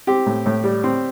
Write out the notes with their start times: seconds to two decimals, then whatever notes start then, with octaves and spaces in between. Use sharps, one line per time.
0.07 C4 G4
0.26 A2
0.46 A2
0.64 G3
0.84 C4